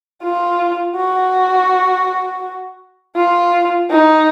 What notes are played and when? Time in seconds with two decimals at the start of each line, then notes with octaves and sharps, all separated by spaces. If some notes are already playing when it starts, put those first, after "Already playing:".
0.24 F4
0.97 F#4
3.16 F4
3.91 D#4